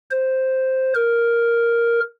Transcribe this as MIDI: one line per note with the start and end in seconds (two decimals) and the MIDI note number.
0.11 0.93 72
0.95 2.00 70